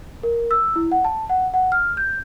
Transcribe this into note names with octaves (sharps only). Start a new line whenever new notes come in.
A#4
E6
E4
F#5
A5
F#5
F#5
F6
G6